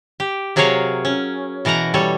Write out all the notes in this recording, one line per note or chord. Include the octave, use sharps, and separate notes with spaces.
G4
C3 F#3 G#4 A#4 C#5 F5
C#4
B2 E3 A#4 F#5 A#5
G3 A4 C#5